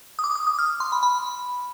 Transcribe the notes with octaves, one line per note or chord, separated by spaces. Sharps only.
D#6
D6
D#6
D#6
F6
C6
B5
B5